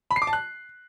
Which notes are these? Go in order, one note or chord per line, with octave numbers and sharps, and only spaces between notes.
B5
C7
D6
A5
F#6